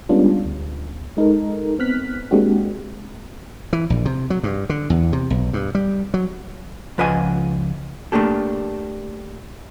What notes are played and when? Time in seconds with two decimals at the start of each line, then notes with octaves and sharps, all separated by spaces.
0.09 G3 G#3 B3 C#4 D4 F4
0.45 D2
1.17 G#3 D#4 A4 A#4
1.79 B3 C4 F6 F#6 B6
2.31 G#3 A#3 C4 D4 F#4 G4
3.73 E3
3.90 A#1
4.05 C3
4.30 F#3
4.43 G2
4.69 D3
4.90 E2
5.13 C3
5.30 B1
5.53 G2
5.75 G3
6.14 F#3
6.98 C#2 F3 B4 D#5 F#5 G#5
8.12 A3 A#3 D4 G4 A4